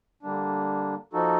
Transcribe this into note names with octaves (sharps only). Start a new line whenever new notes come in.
D3 G3 A#3 D4
F3 A#3 D#4 F#4 A4